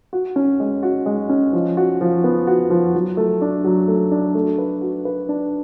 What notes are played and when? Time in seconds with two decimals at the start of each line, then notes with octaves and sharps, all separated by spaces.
0.13 F#4
0.36 C#4
0.60 G#3
0.83 F#4
1.06 G#3
1.29 C#4
1.53 F3
1.77 F#4
2.01 F3
2.24 B3
2.47 F#4
2.70 F3
2.95 F#3
3.17 A3
3.41 D4
3.64 F#3
3.88 A3
4.11 D4
4.35 A3
4.58 B4
4.81 F#4
5.05 B4
5.29 D4